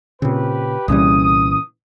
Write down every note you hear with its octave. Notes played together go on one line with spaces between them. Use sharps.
A#2 C#3 C4 G4 B4
C2 A#2 C#3 E3 G3 D#6